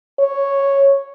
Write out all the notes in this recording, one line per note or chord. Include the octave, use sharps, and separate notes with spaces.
C#5